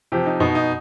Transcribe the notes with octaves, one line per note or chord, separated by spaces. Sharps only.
C3 F3 G4
D#4
B2 D#4
D#4